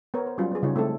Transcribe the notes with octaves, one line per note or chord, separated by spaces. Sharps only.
B3 A#4 C#5
C5
F#3 G3 C#4 F4
B3 G#4
C#3 G3 D#4 F4 C#5
G#3 A3 C4 E4 A4